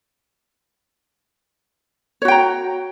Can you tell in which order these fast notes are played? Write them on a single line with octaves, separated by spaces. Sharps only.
C#5 F#4 G5 A#5